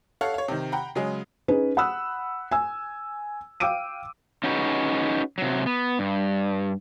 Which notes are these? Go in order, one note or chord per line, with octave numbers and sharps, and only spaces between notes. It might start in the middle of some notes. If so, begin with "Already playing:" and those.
A4 C#5 F5 F#5
C#5 F5
C3 D#3
F#5 G5 A#5 B5
C#3 F#3 G#3 G#4
C#4 D#4 G#4 B4
F#5 B5 D#6 E6 F#6
G#5 E6
F5 G5 D6 E6 D7 D#7
C#4 D#4 F#4 G#4 B4
C3 F#3
B3
G2